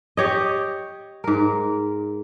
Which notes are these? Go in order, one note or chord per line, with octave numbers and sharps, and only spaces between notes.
G4 C#5 D#5
G#2 A#4